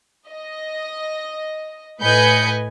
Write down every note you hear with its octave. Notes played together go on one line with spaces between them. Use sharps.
D#5
A2 B4 D#5 G#5 G6 C#7